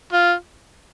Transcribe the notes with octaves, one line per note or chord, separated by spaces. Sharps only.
F4